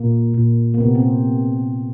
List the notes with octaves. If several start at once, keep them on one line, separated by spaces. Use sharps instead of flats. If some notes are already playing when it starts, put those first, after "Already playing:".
Already playing: A#2 A#3
A#2
A#3
C3 B3
C4